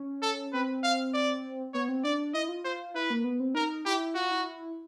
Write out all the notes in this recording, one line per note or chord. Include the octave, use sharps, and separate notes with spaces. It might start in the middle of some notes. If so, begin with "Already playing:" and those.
Already playing: C#4
A4
C4 B4
F5
D5
B3 C#5
C4
D4 D5
E4 D#5
F4
F4 C5
E4 B4
A#3
B3
C4
D#4 A#4
E4 G4
F4 F#4
E4